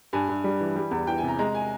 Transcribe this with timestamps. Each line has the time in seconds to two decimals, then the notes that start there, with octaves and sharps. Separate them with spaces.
0.13 G2 G#5
0.29 G2
0.44 G3
0.60 E3
0.76 G3
0.91 E2
1.07 E3 G5
1.18 G#5
1.23 C3
1.28 A#5
1.39 G#3 A#5
1.55 G#5